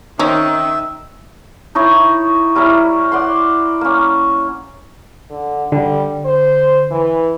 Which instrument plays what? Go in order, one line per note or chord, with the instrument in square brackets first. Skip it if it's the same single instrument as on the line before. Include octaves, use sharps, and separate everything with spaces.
[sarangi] D#3 [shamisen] C4 C#4 [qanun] D#4 [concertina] E5
[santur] D#4 E4 C#5 C#6
G3 E4 A#4 C#5
D5 F#5 C6
A#3 C#4
[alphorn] D3
[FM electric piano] D3 [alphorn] G3
[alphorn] C5
E3